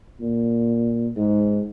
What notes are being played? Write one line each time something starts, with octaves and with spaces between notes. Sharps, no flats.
A#2
G#2